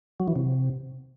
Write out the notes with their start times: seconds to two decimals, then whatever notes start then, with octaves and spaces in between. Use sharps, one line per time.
0.20 F#3
0.28 E3
0.36 C3